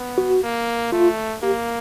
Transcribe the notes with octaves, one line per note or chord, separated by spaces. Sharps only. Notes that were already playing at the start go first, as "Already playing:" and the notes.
Already playing: B3
F#4
A#3
A3 F4
A#3 G4